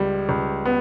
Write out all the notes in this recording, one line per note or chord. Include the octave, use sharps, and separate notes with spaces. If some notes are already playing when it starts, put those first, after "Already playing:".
Already playing: C#2 G3
C#2
B3